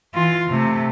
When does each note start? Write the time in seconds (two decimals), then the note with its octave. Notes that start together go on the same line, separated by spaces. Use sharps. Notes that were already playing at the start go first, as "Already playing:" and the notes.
0.14 E3 F4
0.50 C3 A3